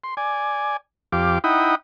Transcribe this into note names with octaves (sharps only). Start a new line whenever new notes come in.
C6
D5 G#5
F2 G4 F5 D6
D#4 E4 F#5 G5 B5 D#6